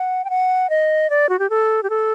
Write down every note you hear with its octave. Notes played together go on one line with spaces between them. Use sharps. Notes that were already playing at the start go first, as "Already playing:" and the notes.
Already playing: F#5
G5
F#5
D#5
D5
F#4
G4
A4
G4
A4